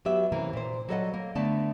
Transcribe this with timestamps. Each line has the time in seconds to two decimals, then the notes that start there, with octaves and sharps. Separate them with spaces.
0.05 F#3 B3 G4 E5
0.32 C3 E3 A#3 C#4
0.53 A#2 C5
0.89 F#3 G3 A4 C#5 D#5 F#5
1.14 A#3
1.35 D3 A3 B3 D5 A5